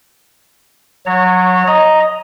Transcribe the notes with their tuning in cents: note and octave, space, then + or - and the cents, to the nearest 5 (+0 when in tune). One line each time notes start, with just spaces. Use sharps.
F#3 -20 C#5 +0 A#5 -35
D#5 +0 A#5 +0